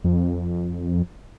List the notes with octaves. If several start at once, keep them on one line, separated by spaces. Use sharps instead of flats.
F2